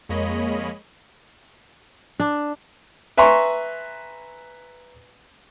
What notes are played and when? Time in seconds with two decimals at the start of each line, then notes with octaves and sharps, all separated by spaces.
0.09 F2 G#3 A#3 C#5 D#5 B5
2.20 D4
3.17 B4 E5 G#5 A#5 C6 C#6